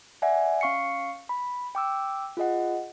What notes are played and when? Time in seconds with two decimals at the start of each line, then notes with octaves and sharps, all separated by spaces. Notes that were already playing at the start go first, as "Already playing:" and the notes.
0.22 D5 E5 F#5 G#5
0.61 C#4 F5 C#6 C7 C#7
1.29 B5
1.75 G5 D6 E6
2.37 F4 G#4 D#5 F#5